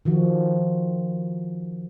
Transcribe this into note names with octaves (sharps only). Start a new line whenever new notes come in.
D#3 F3 F#4